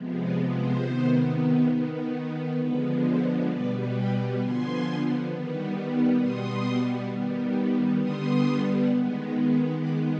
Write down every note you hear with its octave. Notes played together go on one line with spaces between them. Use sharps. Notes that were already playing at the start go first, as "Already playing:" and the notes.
Already playing: C3 F3 G#3 B3
B4 D5
C5
C3 D#3 B3
D#3 B3
D3 F3 G#3 B3 B4
C5
B2 G3 B3 B4 D5
G5 B5
D3 F3 B3 G#5 C6
D#3 G3 B3
B2 G3 B3 C6 D#6
D#3 G3 B3
D3 G3 B3 C6 D#6
D#3 G#3 B3
D#3 G#3 B3 B5 D6